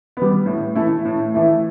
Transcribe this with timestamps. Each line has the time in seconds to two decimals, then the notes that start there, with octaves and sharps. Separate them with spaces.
0.17 G3 B3
0.46 A2
0.75 E3 A3 E4
1.05 A2
1.34 E3 A3 E4